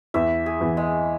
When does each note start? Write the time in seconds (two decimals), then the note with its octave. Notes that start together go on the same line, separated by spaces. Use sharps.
0.14 E2 E3 E5
0.46 G#4
0.61 E2 E3
0.77 G#3